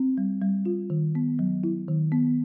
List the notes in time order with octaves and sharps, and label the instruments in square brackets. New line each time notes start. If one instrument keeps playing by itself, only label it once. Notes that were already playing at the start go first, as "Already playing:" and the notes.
Already playing: [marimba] C4
G3
G3
F4
D#3
B3
F#3
E4
D#3
B3